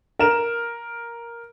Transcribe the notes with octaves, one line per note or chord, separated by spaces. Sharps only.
A#4 E7